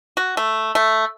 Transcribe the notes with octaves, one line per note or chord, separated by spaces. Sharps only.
F#4
A3
A3